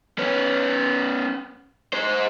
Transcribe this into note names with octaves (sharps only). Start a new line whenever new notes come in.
B3 C#4
G#4 C5